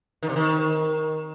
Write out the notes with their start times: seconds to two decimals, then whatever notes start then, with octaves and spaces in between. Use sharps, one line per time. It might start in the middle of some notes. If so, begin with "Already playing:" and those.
0.23 D#3
0.29 C3
0.36 D#3